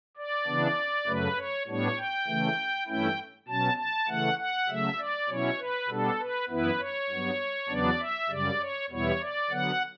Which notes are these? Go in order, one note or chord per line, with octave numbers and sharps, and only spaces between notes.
D5
C#3 E3 B3 D4
F#2 C#3 F#3 A3 B4
C#5
A2 G3 B3 D4 C#5
G5
C#3 E3 A3
G2 E3 A3 C#4 E4 G5
B2 F#3 C#4 A5
A5
C#3 E3 A3 F#5
F#5
C#3 F#3 A3 E5
D5
B2 F#3 C#4 E4 C#5
B4
B2 G3 B3 D4 A4
B4
F#2 E3 B3 E4 B4
C#5
G2 F#3 B3
E2 C#3 F#3 B3 D4 D5
E5
F#2 C#3 G3 D5
C#5
E2 B2 G3 B3 E4 C#5
D5
D3 F#3 B3 F#5